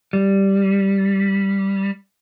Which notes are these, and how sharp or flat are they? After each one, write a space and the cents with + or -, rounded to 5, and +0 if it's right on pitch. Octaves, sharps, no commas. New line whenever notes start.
G3 +0